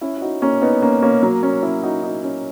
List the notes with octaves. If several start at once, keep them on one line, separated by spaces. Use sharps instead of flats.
C#4 E4
E4
D#4 F#4
A#3 C#4
B3 D#4
A#3 C#4
A#3 C#4
F#3 A#3
A#3 C#4
C#4 E4
D#4 F#4
D#4 F#4
C#4 E4